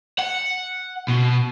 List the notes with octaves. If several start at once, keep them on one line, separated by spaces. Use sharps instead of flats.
F#5
B2